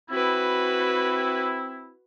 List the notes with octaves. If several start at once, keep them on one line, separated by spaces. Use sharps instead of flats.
C4 E4 F#4 B4